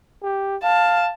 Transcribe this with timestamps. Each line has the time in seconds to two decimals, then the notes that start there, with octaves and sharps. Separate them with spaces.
0.23 G4
0.63 F5 A5